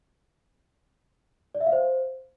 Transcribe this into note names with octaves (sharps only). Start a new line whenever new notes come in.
D5
E5
F5
C5